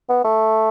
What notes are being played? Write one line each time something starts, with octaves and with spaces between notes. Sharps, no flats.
B3
A3